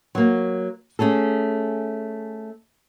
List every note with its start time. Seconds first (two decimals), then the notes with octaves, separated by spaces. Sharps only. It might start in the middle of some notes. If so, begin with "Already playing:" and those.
0.15 F#3 A#3
0.99 A3 C#4 G#4 A4